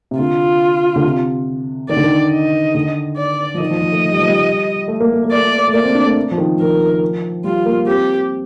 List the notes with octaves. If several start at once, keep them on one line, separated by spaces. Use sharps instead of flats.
C3
D3 F4
D3
C3
D#3 D5
D3
D#3
D#5
D3
D5
F3
D#3 D#5
F3
F3
A3
A3
G3
F3
G3
A3
A#3
A3
A#3
A3 D5
A3
A#3 D5
C4
D4
A3
F3
D#3
F3 A#4
G3 F4
A#3
C4 G4